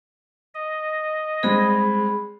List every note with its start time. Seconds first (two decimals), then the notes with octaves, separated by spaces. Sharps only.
0.55 D#5
1.43 G3 G#3 C4 G#4 B5